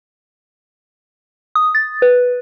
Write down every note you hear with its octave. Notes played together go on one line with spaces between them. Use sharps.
D#6
A6
B4